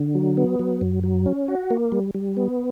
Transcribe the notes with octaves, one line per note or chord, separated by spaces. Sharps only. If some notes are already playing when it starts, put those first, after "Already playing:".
Already playing: D3
F#3
B3
F#3
F#2
F#3
C#4
F#4
A#3
G3
G3
B3